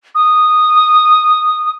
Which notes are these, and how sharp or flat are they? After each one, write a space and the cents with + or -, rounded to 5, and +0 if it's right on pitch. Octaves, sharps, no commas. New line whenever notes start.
D#6 -10